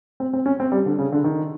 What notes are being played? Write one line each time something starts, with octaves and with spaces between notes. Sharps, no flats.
C4
C4
C#4
C4
G3
D3
C#3
D3
D#3